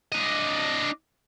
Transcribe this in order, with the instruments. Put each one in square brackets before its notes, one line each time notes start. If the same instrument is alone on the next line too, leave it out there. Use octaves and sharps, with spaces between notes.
[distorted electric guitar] D4 D#5